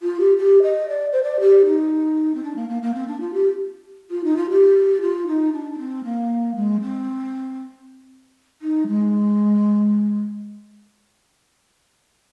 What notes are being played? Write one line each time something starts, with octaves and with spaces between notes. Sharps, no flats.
F4
G4
G4
D#5
D5
C5
D5
G4
D#4
C4
D4
A#3
A#3
A#3
C4
D4
F4
G4
F4
D#4
F4
G4
F4
D#4
D4
D4
C4
A#3
G#3
C4
D#4
G#3